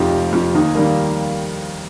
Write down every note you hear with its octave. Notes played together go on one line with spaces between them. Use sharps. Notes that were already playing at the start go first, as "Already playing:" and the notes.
Already playing: F1 F2 F3 D#4 G4
F1
F2 F3
D#2 D#4
D#3 G3 A#3